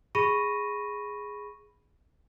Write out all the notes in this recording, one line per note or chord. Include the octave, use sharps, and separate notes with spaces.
G#4 B5 C#6 A#6 D#7